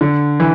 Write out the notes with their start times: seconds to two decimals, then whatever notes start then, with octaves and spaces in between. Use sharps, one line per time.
0.01 D3
0.40 E3